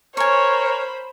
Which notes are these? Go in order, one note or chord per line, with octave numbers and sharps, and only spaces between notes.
A#4 C5 C#5 G#5 B5 C#6